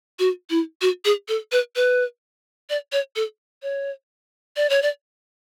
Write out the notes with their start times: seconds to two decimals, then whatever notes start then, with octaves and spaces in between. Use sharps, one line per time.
0.19 F#4
0.50 E4
0.82 F#4
1.05 G#4
1.28 A4
1.52 B4
1.76 B4
2.70 D5
2.92 C#5
3.16 A4
3.63 C#5
4.57 D5
4.70 C#5
4.82 D5